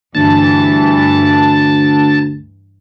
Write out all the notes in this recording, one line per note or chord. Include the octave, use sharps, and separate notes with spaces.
D2 G2 E3 A5